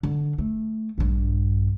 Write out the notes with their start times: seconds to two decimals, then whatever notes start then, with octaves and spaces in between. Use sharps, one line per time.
0.03 D3
0.38 A3
0.98 A#1 G2